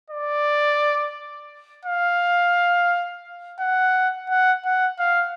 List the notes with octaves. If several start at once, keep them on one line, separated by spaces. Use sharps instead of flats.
D5
F5
F#5
F#5
F#5
F5